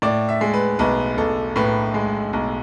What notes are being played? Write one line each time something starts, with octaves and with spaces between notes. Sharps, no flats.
A2 D5
E5
G#3
B4
B1 B4
B1 A4
A2 B4
G#3
B1